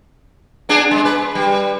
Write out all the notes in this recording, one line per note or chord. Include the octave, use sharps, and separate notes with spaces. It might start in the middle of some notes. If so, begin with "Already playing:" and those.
B3 D4 G#4
G#3
B4
G3